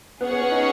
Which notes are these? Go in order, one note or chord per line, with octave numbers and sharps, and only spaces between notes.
B3 C#4 G#4 C#5 F#5
B3
B3
D#4